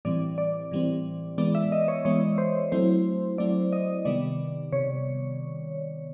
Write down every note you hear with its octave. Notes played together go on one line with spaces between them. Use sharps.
A2 E3 G3 C4 D5
D5
A2 E3 G3 C4
E3 G#3 B3 D5
E5
D#5
C#5
E3 G#3 B3 C#5
C5
F#3 A3 C4 E4 C5
F#3 A3 C4 E4 D5
D#5
C3 D#3 G3 B3 D5
C3 C#5